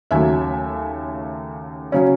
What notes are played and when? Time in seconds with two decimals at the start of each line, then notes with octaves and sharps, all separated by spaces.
0.11 D#2 C#3 F#3 A3 E5 G#5
1.92 C#3 F#3 C#4